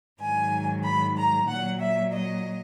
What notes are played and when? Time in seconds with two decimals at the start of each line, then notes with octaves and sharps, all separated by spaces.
0.20 G#2 D#3 F#3 G#5
0.84 B5
1.17 A#5
1.48 A#2 F#3 F#5
1.80 E5
2.13 D#5